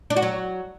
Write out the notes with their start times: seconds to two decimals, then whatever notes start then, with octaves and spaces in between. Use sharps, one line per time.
0.10 D4
0.16 F#4
0.22 F#3